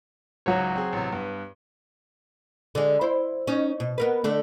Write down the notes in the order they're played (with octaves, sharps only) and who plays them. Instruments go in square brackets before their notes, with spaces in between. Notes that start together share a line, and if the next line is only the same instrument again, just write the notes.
[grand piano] G#1 C#2 [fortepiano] F#3 C#5
[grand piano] C4 G#4
A1 C3
G2 B3
[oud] D3 G#3
E4 C5
C#4 D#4
B2
B3 A#4 B4
D3 A3